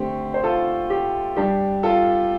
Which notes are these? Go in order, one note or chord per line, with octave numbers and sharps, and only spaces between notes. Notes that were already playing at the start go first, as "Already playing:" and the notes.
Already playing: D3 A3 C4 G4
C5
F4 A4
G4
G2 G3 D4 G4
F4 A4